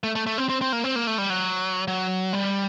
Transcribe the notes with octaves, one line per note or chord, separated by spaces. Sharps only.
A3
A3
A3
C4
C4
C4
A#3
C4
A#3
A3
G3
F#3
F#3
G3